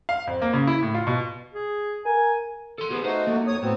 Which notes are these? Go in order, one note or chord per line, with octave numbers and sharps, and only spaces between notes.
F5
F2
A#3
C#3
E4
A2
F4
B2
G#4
A#4 G#5
A4 C6
B3 G4 G#4 B4
A3 D#4 F#4 C5
A#3 A4
F2 C#5 D#6
A2 F#3 B3 C4